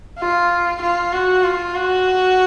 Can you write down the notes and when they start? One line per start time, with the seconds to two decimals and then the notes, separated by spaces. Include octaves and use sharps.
0.19 F4
0.81 F4
1.13 F#4
1.44 F4
1.75 F#4